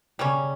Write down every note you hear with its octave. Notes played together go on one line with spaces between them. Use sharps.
C#3 G3 A#3 C#4